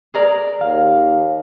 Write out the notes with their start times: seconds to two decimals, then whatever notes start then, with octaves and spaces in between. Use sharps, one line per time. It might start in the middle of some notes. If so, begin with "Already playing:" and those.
0.14 G#4 A#4 D5
0.61 D#2 F5